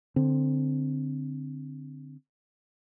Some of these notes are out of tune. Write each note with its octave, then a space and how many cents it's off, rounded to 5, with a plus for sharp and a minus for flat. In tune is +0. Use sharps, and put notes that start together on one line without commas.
D3 +0 C4 +0